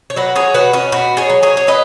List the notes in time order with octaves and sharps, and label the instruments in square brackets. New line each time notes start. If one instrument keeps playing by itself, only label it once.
[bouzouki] C#5
F#3 F#4 B4
G#4 C#5
B2 F#4 B4
C#4 F#4
B2 F#4 B4
G#4 C#5
F#3
G#4 C#5
C#5
F#3 B4 D#5